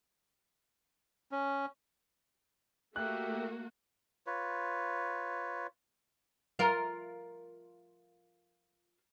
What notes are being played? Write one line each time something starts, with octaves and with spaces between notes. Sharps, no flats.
C#4
A3 A#3 F#4 G4 E5 F#6
F4 B4 C#5
F4 A#4